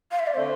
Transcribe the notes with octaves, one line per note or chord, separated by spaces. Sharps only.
F5
E5
D5
D3 A3 C4 C5